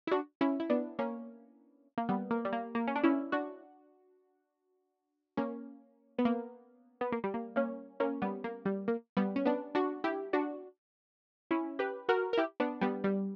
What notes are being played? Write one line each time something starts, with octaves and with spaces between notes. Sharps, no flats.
E4
D4 F#4
C#4 E4
E4
B3 D4
A#3 C#4
A#3
G3 B3
A#3
G3
A#3
A#3
C#4
D4
C#4 E4
D4 F#4
A#3 C#4
B3
A#3
B3
A#3
G3
A#3
A#3 C#4
A#3 C#4
G3 B3
A#3
G3
A#3
G3 B3
C#4
B3 D4
D4 F#4
E4 G4
D4 F#4
C#4 E4
G4 B4
F#4 A#4
A#4
E4 G4
B3 D4
G3 B3
G3